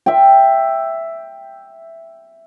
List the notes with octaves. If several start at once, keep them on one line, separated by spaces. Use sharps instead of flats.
E5 G5